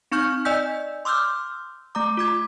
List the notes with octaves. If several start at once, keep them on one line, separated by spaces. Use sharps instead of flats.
C4 D#4 C#6 F6 G6
D5 D#5 G#5 E6 G6 B6
C6 D6 E6 F6 G6
A3 A#5 D6
F4 D6 G#6